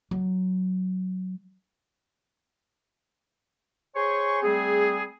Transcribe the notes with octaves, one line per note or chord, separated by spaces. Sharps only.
F#3
G#4 C5 C#5 G#5 C6 C#6
G3 A3 C4 G#4